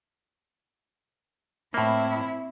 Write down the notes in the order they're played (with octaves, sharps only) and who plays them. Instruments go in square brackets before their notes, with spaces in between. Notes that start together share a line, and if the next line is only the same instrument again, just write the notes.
[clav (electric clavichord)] A2 A#3 [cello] C4 E4